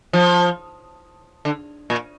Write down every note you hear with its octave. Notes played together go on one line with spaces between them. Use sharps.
F3
D3
A#2